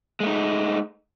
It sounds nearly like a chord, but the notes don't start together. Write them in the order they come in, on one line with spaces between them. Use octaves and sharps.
G#3 A3 D#4